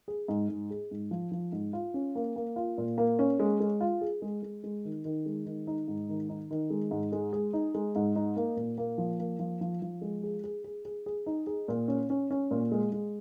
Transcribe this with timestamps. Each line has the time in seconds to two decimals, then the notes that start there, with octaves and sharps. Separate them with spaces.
0.08 G#4
0.28 G#2
0.49 G#2
0.70 G#4
0.91 G#2
1.11 F3
1.32 F3
1.52 G#2
1.73 F4
1.94 C#4
2.15 A#3
2.36 A#3
2.56 F4
2.78 A#2
2.98 A#3
3.19 C#4
3.40 G#3
3.60 G#3
3.81 F4
4.01 G#4
4.22 G#3
4.42 G#3
4.64 G#3
4.85 D#3
5.05 D#3
5.26 G#3
5.46 D#3
5.67 D#4
5.88 G#2
6.09 D#3
6.29 D#4
6.51 D#3
6.70 G#3
6.91 G#2
7.12 G#3
7.33 G#4
7.53 D#4
7.75 G#3
7.96 G#2
8.16 D#4
8.37 A#3
8.56 A#2
8.78 A#3
8.98 F3
9.19 A#3
9.39 F3
9.61 F3
9.82 F3
10.01 G#3
10.23 G#4
10.44 G#4
10.64 G#4
10.85 G#4
11.06 G#4
11.26 D#4
11.47 G#4
11.68 A#2
11.88 C#4
12.10 C#4
12.31 C#4
12.51 A#2
12.72 G#3
12.92 G#3